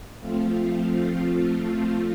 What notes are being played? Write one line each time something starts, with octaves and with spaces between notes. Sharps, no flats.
F3 A3 C4 F4